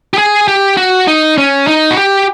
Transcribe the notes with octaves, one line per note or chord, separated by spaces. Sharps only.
G4
G#4
G4
F#4
D#4
C#4
D#4
F#4
G4